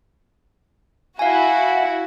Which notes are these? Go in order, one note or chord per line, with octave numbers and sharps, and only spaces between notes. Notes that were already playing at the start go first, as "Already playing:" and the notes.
E4 F#4 F5 G#5